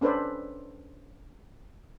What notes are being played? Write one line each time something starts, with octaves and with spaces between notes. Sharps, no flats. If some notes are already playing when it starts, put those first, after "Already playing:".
C#4 D4 A4 B4 C5 D5